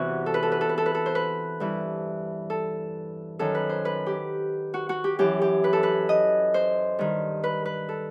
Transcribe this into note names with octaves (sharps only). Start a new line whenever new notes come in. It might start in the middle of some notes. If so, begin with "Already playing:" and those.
Already playing: E2 C3 E3 F#4
A4
B4
A4
B4
A4
B4
A4
B4
A4
C5
B4
G2 E3
A4
F#2 D#3 A4
B4
C5
B4
G4
F#4
F#4
G4
F#2 E3 G4
G4
B4
A4
B4
D#5
C5
G2 D#3
B4
B4
A4